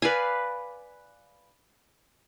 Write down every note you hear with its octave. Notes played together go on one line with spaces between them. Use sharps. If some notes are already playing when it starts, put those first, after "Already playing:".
B4 D5 F5 G#5